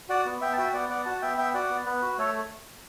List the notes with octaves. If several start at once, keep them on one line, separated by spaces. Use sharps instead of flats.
F#4 D5 F#5
B3
B3 E5 G5
A5
F#4 E5 G5
B3 D5 F#5
B3 D5 F#5
F#4 F#5 A5
B3 E5 G5
B3 E5 G5
F#4 D5 F#5
B3
B3 B4
F#4
A3 A4 C#5